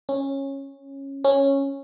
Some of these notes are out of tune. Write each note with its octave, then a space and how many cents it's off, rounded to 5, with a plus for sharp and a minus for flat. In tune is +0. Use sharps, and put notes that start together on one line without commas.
C#4 -15
C#4 -10